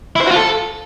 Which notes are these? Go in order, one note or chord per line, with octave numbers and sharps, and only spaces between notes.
E4
C5
F#4
F4
A4